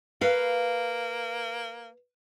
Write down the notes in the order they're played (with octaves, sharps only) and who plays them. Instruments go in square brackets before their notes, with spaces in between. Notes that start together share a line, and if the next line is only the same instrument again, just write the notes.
[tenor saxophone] A#3 [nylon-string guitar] B4 F5